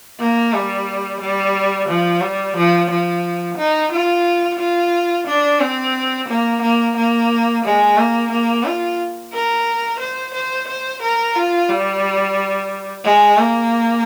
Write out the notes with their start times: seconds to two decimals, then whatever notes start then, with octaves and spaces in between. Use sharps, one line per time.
0.20 A#3
0.53 G3
1.20 G3
1.88 F3
2.21 G3
2.56 F3
2.90 F3
3.57 D#4
3.91 F4
4.59 F4
5.26 D4
5.60 C4
6.28 A#3
6.61 A#3
6.96 A#3
7.64 G#3
7.98 A#3
8.31 A#3
8.65 F4
9.33 A#4
9.99 C5
10.34 C5
10.68 C5
11.02 A#4
11.35 F4
11.69 G3
13.04 G#3
13.38 A#3